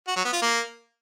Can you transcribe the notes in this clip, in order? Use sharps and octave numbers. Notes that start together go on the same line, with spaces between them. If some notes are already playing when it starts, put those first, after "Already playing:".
F#4
F#3
B3
F4
A#3